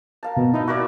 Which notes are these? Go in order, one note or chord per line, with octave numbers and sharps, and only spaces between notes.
A#4 F5 A5
B2
D#4 E4 E5
E4 F#4 A#4 D5